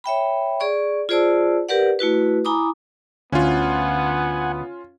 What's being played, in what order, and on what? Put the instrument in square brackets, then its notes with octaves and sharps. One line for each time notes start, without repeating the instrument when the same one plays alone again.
[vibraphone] C#5 E5 G5 B5
G#4 D5 C#6
F4 G#4 C5 D5 A5 E6
G4 A#4 B4 D5 F#5
A3 E4 F#4 B4
E4 G#5 A#5 B5 D6 D#6
[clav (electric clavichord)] D2 [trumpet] B3 [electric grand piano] C#4 F4 [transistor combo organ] F#5 G#5